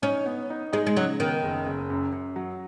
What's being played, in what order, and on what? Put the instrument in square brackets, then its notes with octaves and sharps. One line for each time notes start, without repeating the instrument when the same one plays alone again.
[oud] C#4 [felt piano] D#4
[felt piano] B3
D#4
[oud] G#3 [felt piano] D#4
[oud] G#3
[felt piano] C#3 [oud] F#3
[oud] D#3 [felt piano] B3
[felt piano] F#1
F#1
F#2
F#2
F#3